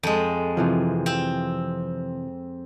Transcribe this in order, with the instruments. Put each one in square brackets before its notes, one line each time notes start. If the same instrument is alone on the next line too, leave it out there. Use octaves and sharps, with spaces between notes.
[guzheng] F2 G#3
[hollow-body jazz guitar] C3 E3 F3
[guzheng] C4